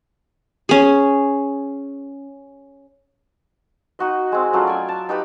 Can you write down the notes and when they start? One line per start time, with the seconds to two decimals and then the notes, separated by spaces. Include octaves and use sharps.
0.69 C#4 G#4
3.99 D#4 F#4 D#5
4.32 G#3 C4
4.53 F#3 A3 C#4 F4
4.67 D5 G#5
4.89 A5
5.09 D#4 G4 B4 B5